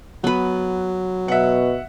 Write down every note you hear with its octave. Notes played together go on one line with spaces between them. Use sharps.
F#3 B3 B4
B2 E5 F#5